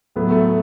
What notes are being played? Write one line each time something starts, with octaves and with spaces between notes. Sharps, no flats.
A2 F#3 A3 B3
A3